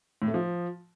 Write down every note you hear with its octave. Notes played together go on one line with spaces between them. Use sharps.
A2
A3
F3